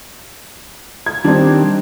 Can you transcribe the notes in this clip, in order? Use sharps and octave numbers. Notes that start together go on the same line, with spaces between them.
G#6
D#3 G3 C4 D4